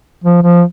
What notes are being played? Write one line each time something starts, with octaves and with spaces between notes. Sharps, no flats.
F3
F3